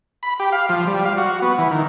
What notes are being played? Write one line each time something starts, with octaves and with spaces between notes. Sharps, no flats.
B5
G4
F5
F3
G3
F5
F#4
B3
E3
D#3